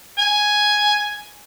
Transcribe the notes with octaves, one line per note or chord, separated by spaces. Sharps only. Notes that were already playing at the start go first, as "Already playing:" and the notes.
G#5